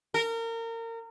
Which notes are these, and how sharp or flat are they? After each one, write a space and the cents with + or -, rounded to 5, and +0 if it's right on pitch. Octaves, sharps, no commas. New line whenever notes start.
A#4 -30